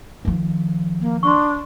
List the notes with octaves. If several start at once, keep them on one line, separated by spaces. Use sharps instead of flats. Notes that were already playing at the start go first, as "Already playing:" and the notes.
D#3 F3
A#3
D4 C6 C#6